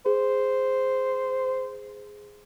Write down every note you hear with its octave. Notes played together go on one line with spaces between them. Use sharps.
G#4 C5